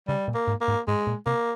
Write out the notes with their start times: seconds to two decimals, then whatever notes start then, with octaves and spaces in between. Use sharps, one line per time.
0.08 C#3 G3
0.28 A#2
0.34 A#3
0.47 G#2
0.61 A#3
0.68 G#2
0.87 G#2 G#3
1.07 A#2
1.26 C3 A#3